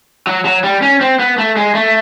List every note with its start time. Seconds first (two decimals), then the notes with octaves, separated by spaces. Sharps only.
0.27 F#3
0.45 F#3
0.64 G3
0.82 C#4
1.01 C4
1.19 B3
1.38 A3
1.57 G#3
1.75 A3